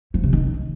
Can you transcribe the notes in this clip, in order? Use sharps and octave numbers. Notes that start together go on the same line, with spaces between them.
F3
C3
D#3